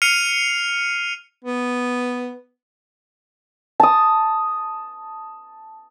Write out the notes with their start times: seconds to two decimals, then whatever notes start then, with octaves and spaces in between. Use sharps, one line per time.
0.02 F6 C7 C#7 D#7 F7
1.44 B3
3.80 A5 D#6